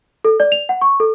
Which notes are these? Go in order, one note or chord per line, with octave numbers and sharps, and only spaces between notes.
A4
D5
F7
F#5
C#6
A4